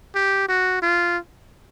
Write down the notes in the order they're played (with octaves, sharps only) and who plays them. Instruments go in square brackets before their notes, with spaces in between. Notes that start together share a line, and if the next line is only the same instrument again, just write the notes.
[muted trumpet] G4
F#4
F4